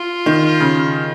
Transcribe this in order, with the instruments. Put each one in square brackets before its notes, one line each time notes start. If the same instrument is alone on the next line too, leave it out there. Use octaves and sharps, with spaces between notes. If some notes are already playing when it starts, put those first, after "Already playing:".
Already playing: [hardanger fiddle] F4
[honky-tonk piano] D#3
C#3